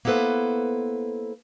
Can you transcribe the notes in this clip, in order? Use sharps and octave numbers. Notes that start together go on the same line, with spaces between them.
A#3 B3 E4 A4 B4 C5